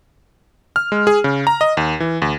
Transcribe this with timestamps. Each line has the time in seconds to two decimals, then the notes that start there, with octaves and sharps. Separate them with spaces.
0.76 F6
0.92 G#3
1.07 G#4
1.24 C#3
1.47 A#5
1.61 D#5
1.77 D#2
2.00 E3
2.22 D2